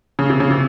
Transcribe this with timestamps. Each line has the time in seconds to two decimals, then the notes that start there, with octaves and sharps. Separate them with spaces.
0.19 C#3
0.30 C3
0.40 C#3
0.50 C3